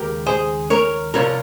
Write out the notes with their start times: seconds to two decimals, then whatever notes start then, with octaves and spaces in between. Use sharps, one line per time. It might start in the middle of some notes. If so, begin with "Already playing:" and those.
Already playing: D#2 C#3 G#3 G4 A#4
0.26 G#4 C5
0.70 A#4 C#5
1.14 C2 C3 F3 A#4 C#5